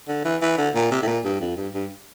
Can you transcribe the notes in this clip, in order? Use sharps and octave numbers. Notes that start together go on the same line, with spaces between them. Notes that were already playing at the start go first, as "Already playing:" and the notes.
D3
E3
E3
D3
A#2
C3
A2
A#2
G2
F2
G2
G2